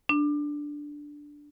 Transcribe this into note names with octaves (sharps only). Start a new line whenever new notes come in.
D4